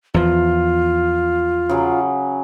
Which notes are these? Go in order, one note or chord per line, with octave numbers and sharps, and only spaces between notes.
E2 F3 F4
C#3 F#3 G#4